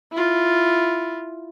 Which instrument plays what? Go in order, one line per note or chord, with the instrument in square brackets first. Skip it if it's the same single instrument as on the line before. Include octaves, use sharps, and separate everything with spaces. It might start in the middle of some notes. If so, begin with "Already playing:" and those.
[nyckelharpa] E4 F4